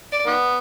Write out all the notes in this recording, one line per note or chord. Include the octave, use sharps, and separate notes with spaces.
D5
D#3 B3